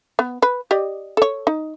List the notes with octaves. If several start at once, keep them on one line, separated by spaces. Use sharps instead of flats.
B3
B4
G4 D5 D#5
A4 C#5
D#4